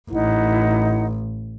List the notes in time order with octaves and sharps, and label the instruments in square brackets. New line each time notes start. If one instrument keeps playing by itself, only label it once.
[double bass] A1 [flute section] D#4 E4 F#5